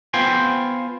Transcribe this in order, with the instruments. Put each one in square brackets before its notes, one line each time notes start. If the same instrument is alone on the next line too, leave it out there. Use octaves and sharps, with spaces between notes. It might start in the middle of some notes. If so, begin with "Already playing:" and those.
[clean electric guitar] B3 F4 C5 G5 G#5